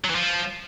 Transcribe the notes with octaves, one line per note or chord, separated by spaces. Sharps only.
F#3
E3
F3